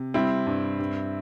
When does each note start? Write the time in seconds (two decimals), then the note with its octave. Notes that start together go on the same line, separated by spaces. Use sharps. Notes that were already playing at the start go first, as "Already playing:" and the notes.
Already playing: C3
0.14 G3 C4 E4
0.47 G2
0.79 G2